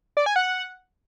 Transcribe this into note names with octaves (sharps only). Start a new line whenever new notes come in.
D5
G#5
F#5